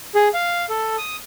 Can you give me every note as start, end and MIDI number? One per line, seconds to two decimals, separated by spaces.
0.15 0.28 68
0.34 0.65 77
0.70 0.96 69
0.98 1.16 87